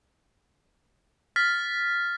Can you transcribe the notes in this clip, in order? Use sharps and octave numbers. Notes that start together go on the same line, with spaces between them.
F6 A6 B6